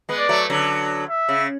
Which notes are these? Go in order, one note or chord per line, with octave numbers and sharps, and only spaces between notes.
G#3 B3
D5
F#3 A3
D3 F#3
E5
C#3